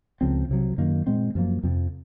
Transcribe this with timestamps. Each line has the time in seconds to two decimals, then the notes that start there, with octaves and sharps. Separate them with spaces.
0.21 C#2 C#3 F3 C4
0.49 C2 C3 F#3
0.78 F#2 D#3 A#3
1.07 A#2 G#3 C4
1.35 F#2 F3 A#3
1.63 F2 C3 F3